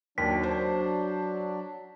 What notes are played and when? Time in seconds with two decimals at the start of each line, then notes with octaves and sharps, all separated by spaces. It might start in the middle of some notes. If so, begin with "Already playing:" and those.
0.18 D#2 F#3 D4 B6
0.43 C5